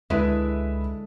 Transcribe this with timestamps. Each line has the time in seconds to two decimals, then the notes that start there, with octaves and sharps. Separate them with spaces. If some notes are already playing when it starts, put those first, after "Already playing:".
0.10 C#2 D3 G#3 E4 B4 E5